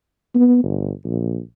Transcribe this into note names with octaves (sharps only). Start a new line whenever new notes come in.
B3
G1
A#1